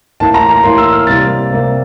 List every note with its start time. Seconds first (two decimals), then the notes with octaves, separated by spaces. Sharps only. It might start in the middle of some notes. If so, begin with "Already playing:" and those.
0.20 A2 E3 A#3 A5
0.34 A#5
0.49 A#5
0.63 A2 E3 A#3 C6
0.78 E6
0.92 F6
1.07 C3 G3 A#3 A6
1.50 C3 G3 A#3